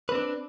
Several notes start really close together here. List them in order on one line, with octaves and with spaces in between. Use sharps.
B4 C4 D4